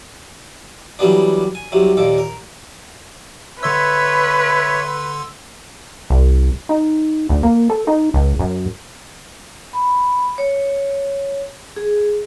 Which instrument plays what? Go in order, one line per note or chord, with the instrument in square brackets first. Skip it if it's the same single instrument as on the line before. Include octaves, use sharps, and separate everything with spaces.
[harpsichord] E3 F#3 G3 B3 D4
G#5
C2 C3 F#3
D#2 A#2 A4 D6
A#4
[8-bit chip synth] D3 C6 E6 [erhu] B4 [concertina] C#5 E5
[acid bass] C2
D#4
D2
A#3
A4
D#4
C#2
F#2
[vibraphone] B5
C#5
G#4